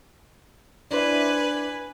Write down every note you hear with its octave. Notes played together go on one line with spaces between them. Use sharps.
D4 E4 B4 C5 G#5